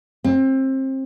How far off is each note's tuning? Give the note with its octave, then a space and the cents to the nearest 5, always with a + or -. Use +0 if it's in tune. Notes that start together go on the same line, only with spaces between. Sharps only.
C4 +25